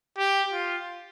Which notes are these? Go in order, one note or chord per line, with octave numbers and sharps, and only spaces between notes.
G4
F4